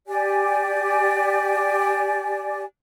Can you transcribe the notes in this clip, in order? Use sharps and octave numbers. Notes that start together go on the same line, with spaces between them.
G4 D5 G#5